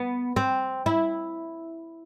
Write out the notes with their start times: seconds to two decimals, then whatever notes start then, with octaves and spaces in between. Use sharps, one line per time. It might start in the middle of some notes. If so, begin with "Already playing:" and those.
Already playing: B3
0.36 C4
0.86 E4